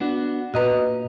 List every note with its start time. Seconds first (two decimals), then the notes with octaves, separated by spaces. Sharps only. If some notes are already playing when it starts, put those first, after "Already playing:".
0.01 B3 D4 F#4
0.54 A#2 F#4 B4 D#5 A#5